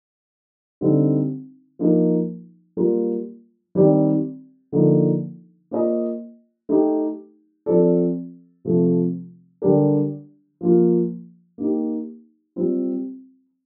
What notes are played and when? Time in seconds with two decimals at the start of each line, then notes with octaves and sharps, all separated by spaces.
0.81 D3 G3 C4 D#4
1.79 F3 A#3 D#4 A#4
2.77 G3 A#3 F4 A#4
3.75 D#3 G3 C4 G4 D5
4.72 D3 F3 A#3 D#4 A4
5.71 A#3 F4 C5 D#5
6.69 A3 D#4 G4
7.66 F3 C4 F4 A4 D5
8.65 C3 F3 A3
9.62 D3 G3 D4 G4 A#4
10.61 F3 A#3 F4
11.58 A#3 D#4 G4
12.56 G3 C4 F4